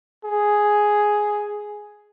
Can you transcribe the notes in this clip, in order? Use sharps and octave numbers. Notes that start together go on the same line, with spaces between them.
G#4